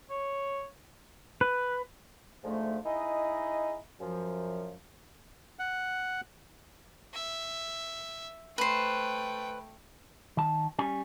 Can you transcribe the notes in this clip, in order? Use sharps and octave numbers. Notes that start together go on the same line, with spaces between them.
C#5
B4
G#2 D3 F3 A3
D#4 E4 G#4 D#5
F#2 F3
F#5
E5
A3 B4 C5 G5
D#3 A5
G3 C#4 G#5